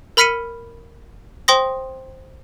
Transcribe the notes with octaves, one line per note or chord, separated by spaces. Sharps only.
A#4 B5 F6 B6 C#7 D#7
C5 G5 C6 D#6 A#6